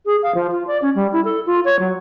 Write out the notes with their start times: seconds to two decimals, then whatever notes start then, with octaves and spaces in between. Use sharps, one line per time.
0.05 G#4
0.22 F5
0.34 F3
0.51 F4
0.67 D5
0.81 C#4
0.95 G3
1.12 E4
1.24 A4
1.46 F4
1.64 C#5
1.79 F#3